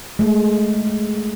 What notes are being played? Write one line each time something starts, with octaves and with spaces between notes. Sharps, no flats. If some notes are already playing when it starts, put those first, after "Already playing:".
G#3 A3